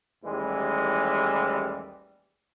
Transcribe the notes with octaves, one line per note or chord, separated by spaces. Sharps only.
A1 D#2 E3 G3 G#3